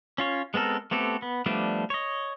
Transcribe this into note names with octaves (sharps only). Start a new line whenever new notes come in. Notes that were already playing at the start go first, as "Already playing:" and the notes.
C#4 F4 C#5
G#3 B3 C4 A4 A#4
A3 B3 C4 G4 A4
B3
F3 G3 A3 B3 D4
C#5 D#5